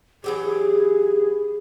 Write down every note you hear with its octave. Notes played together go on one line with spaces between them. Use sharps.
E3 F#3 G4 G#4